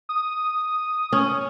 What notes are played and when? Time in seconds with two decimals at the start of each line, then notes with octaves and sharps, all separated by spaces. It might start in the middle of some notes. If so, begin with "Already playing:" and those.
0.09 D#6
1.13 C#4